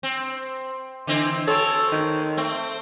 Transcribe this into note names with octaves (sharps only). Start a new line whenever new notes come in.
C4
D3 E3 C4
C4 A4 C#5
D#3
A3 C4